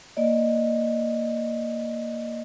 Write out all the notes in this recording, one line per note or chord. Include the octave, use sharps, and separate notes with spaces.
A#3 D5 D#5